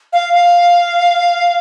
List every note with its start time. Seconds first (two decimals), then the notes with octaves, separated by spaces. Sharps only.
0.13 F5
0.33 F5